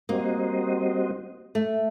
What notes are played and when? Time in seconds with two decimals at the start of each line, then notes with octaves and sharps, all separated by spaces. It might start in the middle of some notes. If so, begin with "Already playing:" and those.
0.09 G3 A#3 C4 F#4 C5 D#5
1.55 A3